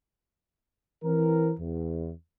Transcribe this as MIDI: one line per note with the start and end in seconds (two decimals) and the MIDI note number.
1.04 1.53 52
1.04 1.53 60
1.04 1.53 70
1.60 2.10 40